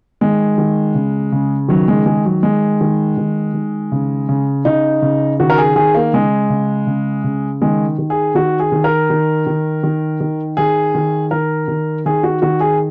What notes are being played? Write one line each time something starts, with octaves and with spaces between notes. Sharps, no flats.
D#3 G#3
D#3
C#3
C#3
D#3 F#3
G#3
D#3 G#3
F#3
D#3 G#3
D#3
D#3
D#3
C#3
C#3
C#3 D#4
C#3
D#3 F#4
A#4
G#4
D#3 G#4
A#3
C#3 G#3
C#3
C#3
C#3
D#3 G#3
D#3
G#4
D#3 F#4
G#4
D#3
A#4
D#3
D#3
D#3
D#3
D#3 G#4
D#3
D#3 A#4
D#3
D#3 G#4
F#4
D#3 F#4
G#4